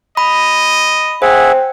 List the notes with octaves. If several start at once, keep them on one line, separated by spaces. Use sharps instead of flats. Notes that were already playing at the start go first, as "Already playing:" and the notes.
D#5 B5
G#4 C5 E5 F#5 G5